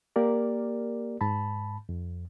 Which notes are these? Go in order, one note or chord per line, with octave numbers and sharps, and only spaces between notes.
A#3 G4 A#4 D5
G#2 A5 B5
F2